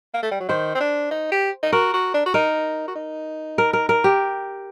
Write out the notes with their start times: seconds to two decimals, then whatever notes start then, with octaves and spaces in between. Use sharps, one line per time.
0.14 A#3
0.23 A3
0.31 G3
0.40 F#3
0.48 D#3 C5
0.75 C4
0.80 D4
1.11 D#4
1.32 G4
1.63 D#4
1.72 F#4 A#4
1.94 F#4
2.14 D4
2.26 F#4
2.34 D#4 A#4
2.88 F#4
2.96 D#4
3.58 A#4
3.73 A#4
3.89 A#4
4.04 G4